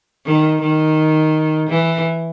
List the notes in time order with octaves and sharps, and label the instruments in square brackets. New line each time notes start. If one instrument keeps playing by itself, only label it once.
[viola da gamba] D#3
D#3
E3